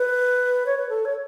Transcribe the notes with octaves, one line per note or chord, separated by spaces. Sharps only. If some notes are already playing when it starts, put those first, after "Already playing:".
Already playing: B4
C#5
B4
A4
C#5